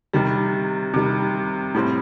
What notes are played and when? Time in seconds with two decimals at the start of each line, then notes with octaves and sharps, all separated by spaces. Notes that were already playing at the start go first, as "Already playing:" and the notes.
0.13 C3 D#3 G3
0.94 C3 D#3 G3
1.75 A2 G3 C4